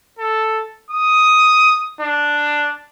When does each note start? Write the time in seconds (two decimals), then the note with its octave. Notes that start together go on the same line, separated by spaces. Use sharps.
0.19 A4
0.90 D#6
2.01 D4